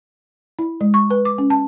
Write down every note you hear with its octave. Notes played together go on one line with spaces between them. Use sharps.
E4
G#3
C#6
B4
D6
C#4
A5